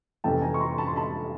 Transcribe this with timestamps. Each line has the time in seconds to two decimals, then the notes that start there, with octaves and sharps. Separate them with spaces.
0.24 F2 C3 E3 A3 C#4 G5 A5
0.42 G#5 A#5
0.54 C#6
0.60 A#5 C6
0.78 A5 B5
0.87 C6
0.96 A5 B5